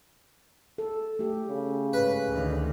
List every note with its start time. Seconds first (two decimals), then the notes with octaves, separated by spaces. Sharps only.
0.78 A4
1.19 A3 G4
1.50 C#3
1.93 G#2 B4
2.30 D2 D#3